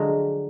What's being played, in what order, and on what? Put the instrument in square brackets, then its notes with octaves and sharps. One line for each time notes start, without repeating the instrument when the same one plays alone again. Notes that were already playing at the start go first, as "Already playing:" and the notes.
Already playing: [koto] D3 F3 F#3 G#3